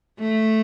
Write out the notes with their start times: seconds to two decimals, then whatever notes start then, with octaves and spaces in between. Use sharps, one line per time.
0.20 A3